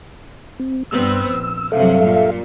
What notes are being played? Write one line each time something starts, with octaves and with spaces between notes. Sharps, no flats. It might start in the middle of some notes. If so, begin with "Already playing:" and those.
C4
G2 B3 C4 E6
A#1
G2 C3 F#3 A4 E5 F5
A#2